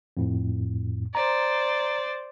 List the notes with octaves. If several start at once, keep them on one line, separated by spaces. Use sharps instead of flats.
F2 A2
C5 D5 A#5